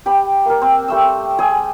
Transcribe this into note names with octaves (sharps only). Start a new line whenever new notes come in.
G4 G5 B5
A#3 A#4
C4
G3 A3 E6
G3 G#4 G5 G#5